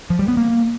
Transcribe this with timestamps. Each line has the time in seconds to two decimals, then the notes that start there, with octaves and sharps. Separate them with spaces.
0.10 F3
0.19 G3
0.28 B3
0.37 A#3